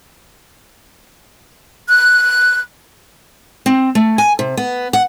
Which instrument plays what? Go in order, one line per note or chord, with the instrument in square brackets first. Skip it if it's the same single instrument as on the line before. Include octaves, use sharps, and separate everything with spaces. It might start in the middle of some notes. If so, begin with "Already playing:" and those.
[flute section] F#6
[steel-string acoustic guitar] C4
A3
G#5
C3
B3
F#5